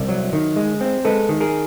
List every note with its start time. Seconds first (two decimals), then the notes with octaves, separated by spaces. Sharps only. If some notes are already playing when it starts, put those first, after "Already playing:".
Already playing: C2 D5 E5
0.09 F#3
0.33 D#3
0.56 G#3
0.81 C4
1.05 G#3 A4 B4
1.29 D#3
1.40 G#4 A#4